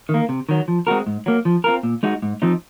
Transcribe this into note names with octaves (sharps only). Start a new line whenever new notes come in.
D#3 A#3
C3
D#3 F#3
F3
G#3 C4 F#4 A#4
G#2
F#3 A#3
F3
C4 F4 A#4
A#2
G#3 D#4 F#4
G#2
F3 C4 D#4